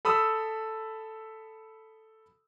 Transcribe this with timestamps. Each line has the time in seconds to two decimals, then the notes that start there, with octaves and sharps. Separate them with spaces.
0.05 A4 B5 D#6 E6